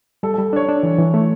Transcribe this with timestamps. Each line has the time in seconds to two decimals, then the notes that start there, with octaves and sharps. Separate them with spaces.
0.23 G3 A4
0.34 G3 A4
0.53 D4 C#5
0.69 D4
0.83 E3
0.98 E3
1.14 A3